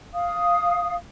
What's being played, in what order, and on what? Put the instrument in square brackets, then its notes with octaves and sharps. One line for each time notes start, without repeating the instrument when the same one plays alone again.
[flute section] F5 D#6